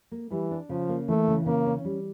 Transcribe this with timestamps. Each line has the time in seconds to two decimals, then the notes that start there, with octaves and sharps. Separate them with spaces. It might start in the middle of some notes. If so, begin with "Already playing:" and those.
0.12 A#3
0.31 E3 G3
0.51 D4
0.69 C#3 F3
0.89 A#3
1.08 E3 A3
1.28 C#3
1.46 C#3 A#3
1.66 C#4
1.85 G3